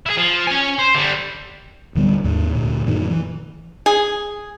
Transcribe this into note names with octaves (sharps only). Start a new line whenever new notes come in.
E4 G#4
F3
C#4 G#5
C5
D3 G3
D1 D3 G3 B3
D#2 G#2
D2 A#2
F#2 A#2 D#3
E3
G#4